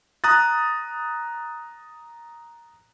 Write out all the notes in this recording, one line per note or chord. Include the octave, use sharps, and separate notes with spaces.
A#5 D#6 F#6 A6